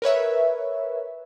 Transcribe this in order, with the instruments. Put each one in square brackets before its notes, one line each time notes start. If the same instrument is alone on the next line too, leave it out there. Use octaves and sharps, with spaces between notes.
[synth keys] A#4 B4 C#5 E5